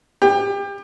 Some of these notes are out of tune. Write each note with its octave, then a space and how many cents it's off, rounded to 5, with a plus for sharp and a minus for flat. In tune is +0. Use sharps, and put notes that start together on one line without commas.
G4 +30